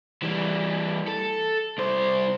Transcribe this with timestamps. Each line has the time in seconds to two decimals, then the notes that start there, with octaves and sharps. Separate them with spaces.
0.22 E3 G3
1.08 A4
1.78 C2 C5